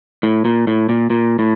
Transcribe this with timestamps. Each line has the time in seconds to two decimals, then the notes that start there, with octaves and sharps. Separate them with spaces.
0.23 A2
0.45 A#2
0.67 A2
0.89 A#2
1.10 A#2
1.39 A2